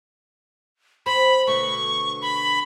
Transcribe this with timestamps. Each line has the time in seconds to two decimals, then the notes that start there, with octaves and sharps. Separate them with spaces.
1.06 C4 B5
1.47 B2 D3 A3 C#6
2.22 B5